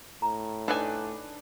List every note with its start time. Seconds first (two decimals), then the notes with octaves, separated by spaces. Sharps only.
0.22 A2 A#5
0.68 D4 D#4 A4 B4 G#5